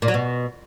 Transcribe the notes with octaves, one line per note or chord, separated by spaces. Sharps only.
A#2
F#3
B2